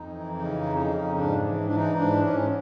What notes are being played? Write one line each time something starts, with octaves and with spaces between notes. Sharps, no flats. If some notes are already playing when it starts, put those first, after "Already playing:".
Already playing: F2 D#4
E3
C#3 D#4
F2
D#4
C#3
G#2 D4
E3
E3 D4
D#4
G#2 D4
G#2 C#4